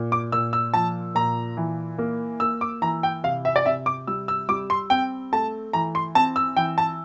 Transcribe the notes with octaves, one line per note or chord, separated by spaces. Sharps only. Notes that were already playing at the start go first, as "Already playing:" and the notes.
Already playing: A#2
D6
A#2 E6
E6
F3 A5
A#2 A#5
E3
A#3
A#3 E6
D6
E3 A#5
G5
C3 F5
E5
D5
C3 E5
D6
G3 E6
E6
G3 D6
C6
C4 G5
A3 A5
E3 A#5
C6
C4 A5
E6
E3 G5
A5